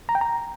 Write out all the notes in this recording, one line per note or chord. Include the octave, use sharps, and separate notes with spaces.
A#5
G5
A#5